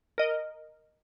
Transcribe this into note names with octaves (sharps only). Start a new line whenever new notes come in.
A#4 D#5